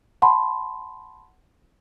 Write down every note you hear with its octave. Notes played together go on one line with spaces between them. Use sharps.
F#5 A5 B5 C6